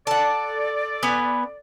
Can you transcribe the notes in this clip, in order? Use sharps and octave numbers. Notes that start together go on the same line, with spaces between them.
A4 D5 F#5 A5
B3 B4 G#5